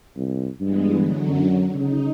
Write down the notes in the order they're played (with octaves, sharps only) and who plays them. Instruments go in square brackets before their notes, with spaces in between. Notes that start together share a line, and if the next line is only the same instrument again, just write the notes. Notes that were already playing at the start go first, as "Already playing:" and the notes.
[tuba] C2
[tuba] G2 [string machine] E3 G#3 B3
[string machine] D3 F#3
[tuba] F#2
[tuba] C#3 [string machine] D#4